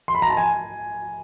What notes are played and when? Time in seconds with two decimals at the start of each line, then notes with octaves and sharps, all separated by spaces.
0.08 C6
0.15 B5
0.22 A#5
0.30 A5
0.37 G#5